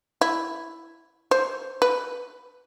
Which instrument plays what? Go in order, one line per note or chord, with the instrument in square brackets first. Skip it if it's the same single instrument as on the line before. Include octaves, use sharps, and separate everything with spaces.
[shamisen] E4
C5
B4